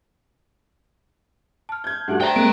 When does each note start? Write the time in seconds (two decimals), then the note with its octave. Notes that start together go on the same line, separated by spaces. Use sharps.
1.69 A5 F6
1.84 G6 G#6
2.08 G2 A3 F#4 G4 A4 F#5 A5
2.21 C5 D5 E5 G5 A#5
2.36 G#3 A#3 C4 F#6 D7